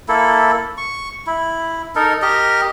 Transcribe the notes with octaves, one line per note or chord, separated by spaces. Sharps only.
A#3 E4 A4
C#6
E4
D#4 A4 A#4
G4 A#4 D#5